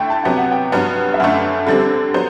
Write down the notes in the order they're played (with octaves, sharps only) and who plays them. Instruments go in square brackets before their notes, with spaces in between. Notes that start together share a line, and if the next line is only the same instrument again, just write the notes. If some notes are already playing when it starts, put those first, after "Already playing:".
Already playing: [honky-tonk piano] D3 A3 E4 [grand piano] G5
[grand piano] A5
[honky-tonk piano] C3 F#3 B3 [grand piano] G5
[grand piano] F#5
G5
[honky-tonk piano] G2 F#3 B3
[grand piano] E5
[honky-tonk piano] F#2 D3 A3 [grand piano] F#5
[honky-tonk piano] D3 G3 C4 [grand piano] A4
[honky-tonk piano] F#3 B3 C5